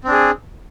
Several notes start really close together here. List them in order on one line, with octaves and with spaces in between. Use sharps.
C4 D4 G#4